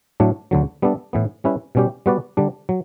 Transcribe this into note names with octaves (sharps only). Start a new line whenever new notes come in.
A2 F#3 A3 D4
D2 D3 F#3
G3 B3 D4 A4 E5
A2 E3 B3
G3 C#4 E4 B4
B2 G3 C#4 G4
G3 B3 F#4 B4 D5
D3 G3 D4
F#3